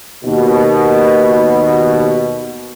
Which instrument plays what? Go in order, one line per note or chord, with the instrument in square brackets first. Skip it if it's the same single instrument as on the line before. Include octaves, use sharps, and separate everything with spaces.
[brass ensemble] D#2 B2